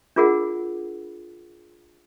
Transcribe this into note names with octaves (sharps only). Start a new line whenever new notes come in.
D4 F4 G#4 A#4 F#5